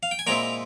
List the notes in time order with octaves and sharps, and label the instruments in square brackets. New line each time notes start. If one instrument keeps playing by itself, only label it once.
[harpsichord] F5
G5
G#5
A#2 G#3 C4 E4 G5 A#5